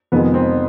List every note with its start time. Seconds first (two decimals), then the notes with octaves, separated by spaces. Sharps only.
0.12 F2 C3 D#3 G#3 B3
0.34 C4